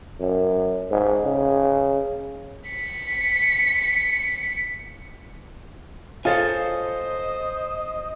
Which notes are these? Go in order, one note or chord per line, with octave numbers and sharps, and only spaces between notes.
F#2
G#2
C#3
B6 C#7
F4 A4 C5 C#5 D#5 G#5